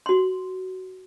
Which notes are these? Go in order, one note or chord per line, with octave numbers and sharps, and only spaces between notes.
F#4 C6